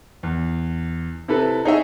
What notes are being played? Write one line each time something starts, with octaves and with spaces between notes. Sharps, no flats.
E2
C3 E4 A4 B4
D#4 G#4 C#5 D#5 E5